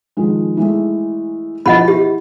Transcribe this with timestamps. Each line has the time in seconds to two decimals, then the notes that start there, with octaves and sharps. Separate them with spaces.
0.17 D#3 F3 G#3
0.57 E3 G#3 A3
1.66 B2 E3 F3 D#5 F#5 B5
1.88 E4 G4